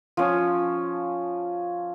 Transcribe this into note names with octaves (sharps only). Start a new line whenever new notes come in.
F3 C#4